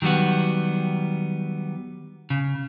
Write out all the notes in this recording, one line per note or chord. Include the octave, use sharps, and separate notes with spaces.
D#3 F#3 G3 B3 F#4
C#3